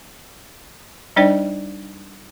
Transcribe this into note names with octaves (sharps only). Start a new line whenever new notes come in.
G3 D4 D#4 C5 D5 G5